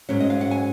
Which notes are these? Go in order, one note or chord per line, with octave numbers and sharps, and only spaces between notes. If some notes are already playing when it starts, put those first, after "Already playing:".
G#2 F#3 C#4
D#5
F5
F#5
G#5